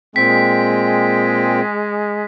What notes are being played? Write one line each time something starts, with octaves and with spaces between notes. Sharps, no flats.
A#2 G#3 C4 G5 B6